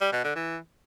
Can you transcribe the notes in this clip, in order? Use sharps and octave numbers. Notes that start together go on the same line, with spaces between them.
G3
B2
D3
E3